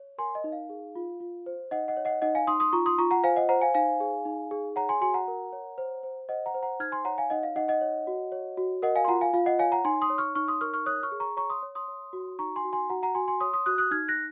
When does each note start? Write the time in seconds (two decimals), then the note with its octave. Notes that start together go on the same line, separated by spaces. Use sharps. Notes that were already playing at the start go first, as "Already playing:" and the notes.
Already playing: C#5
0.18 A#4 G#5 C6
0.35 D#5
0.44 D#4
0.52 F5
0.70 G#4
0.95 F4
1.20 F4
1.46 C5
1.71 D#4 D#5 F#5
1.88 D#5 F#5
1.97 C#5
2.05 D#5 F#5
2.22 D#4 D#5 F#5
2.35 F5 G#5
2.47 D#4 C6 D#6
2.60 C6 D#6
2.73 F4 A#5 C#6
2.86 C6 D#6
2.98 F4 A#5 C#6
3.11 F#5 A#5
3.24 C5 F5 G#5
3.36 D#5 F#5
3.49 C5 F#5 A#5
3.61 F5 G#5
3.74 D#4 F5 G#5
4.00 G#4
4.25 D#4
4.51 G#4
4.76 C#5 F#5 A#5
4.89 G#5 C6
5.01 F#4 G#5 C6
5.14 F#5 A#5
5.28 A#4
5.53 C#5
5.78 C5
6.03 C5
6.29 C5 D#5 F#5
6.46 F#5 A#5
6.54 C5
6.62 F#5 A#5
6.80 D#4 F6 G#6
6.92 G#5 C6
7.05 C#5 F#5 A#5
7.18 F5 G#5
7.30 D#4 D#5 F#5
7.43 F5
7.56 D#4 D#5 F#5
7.68 D#5 F#5
7.81 C#5
8.07 F#4
8.32 C#5
8.57 F#4
8.82 A#4 D#5 F#5
8.96 F5 G#5
9.05 C6
9.08 F4 F#5 A#5
9.21 F5 G#5
9.33 F4 F5
9.46 D#5 F#5
9.59 C#5 F5 G#5
9.72 F#5 A#5
9.85 D#4 G#5 C6
10.02 C6 D#6
10.10 C#5
10.18 C#6 F6
10.35 D#4 C#6 F6
10.48 C6 D#6
10.61 A#4 C#6 F6
10.74 C#6 F6
10.86 C#5 D#6 F#6
11.03 C#6 F6
11.12 G#4
11.20 A#5 C#6
11.37 C#5 A#5 C#6
11.50 C6 D#6
11.63 C#5
11.75 C6 D#6
11.88 C#5
12.13 F#4
12.39 D#4 A#5 C#6
12.56 G#5 C6
12.64 F#4
12.73 G#5 C6
12.90 F#4 F#5 A#5
13.03 F#5 A#5
13.15 F#4 G#5 C6
13.28 G#5 C6
13.40 C#5 C6 D#6
13.53 C6 D#6
13.66 F#4 D#6 F#6
13.78 D#6 F#6
13.91 D#4 F6 G#6
14.08 F#6 A#6